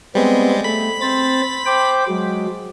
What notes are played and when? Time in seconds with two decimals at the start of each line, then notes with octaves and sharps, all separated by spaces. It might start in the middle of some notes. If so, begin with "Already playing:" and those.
0.15 G3 G#3 B3 C4
0.64 A3 B5 B6
1.01 C4 C5 A6
1.66 C5 G5 D6
2.08 F#3 G#3